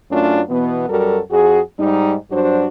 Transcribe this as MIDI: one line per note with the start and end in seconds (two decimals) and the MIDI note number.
0.10 0.40 42
0.10 0.40 57
0.10 0.40 61
0.10 0.40 62
0.10 0.40 65
0.49 0.87 47
0.49 0.87 52
0.49 0.87 59
0.88 1.18 42
0.88 1.18 55
0.88 1.18 66
0.88 1.18 69
0.88 1.18 70
1.31 1.59 41
1.31 1.59 66
1.31 1.59 68
1.77 2.14 44
1.77 2.14 55
1.77 2.14 63
2.30 2.65 43
2.30 2.65 54
2.30 2.65 62
2.30 2.65 66
2.30 2.65 72